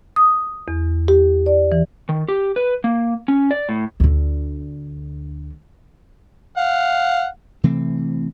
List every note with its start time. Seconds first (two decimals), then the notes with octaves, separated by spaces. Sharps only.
0.16 D#6
0.68 E2
1.08 G4
1.46 D5
1.72 E3
2.09 D#3
2.28 G4
2.56 B4
2.84 A#3
3.28 C#4
3.51 D5
3.69 A2
4.00 D2 D3
6.57 F5 F#5
7.64 C3 E3 A3 C4